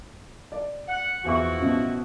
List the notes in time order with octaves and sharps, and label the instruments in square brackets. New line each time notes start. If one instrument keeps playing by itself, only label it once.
[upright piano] D5
[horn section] F#5
[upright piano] E2 E5 C#6 [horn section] F3 E4 F#4
[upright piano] A1 B2